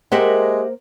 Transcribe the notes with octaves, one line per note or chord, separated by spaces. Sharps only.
G#3 A#3 G4 A#4 C5 E5 F#5